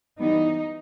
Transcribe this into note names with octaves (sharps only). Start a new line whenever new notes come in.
E3 G3 B3 D#4